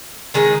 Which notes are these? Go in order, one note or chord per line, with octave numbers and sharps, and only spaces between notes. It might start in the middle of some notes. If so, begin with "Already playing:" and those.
D#3 G#3 D#4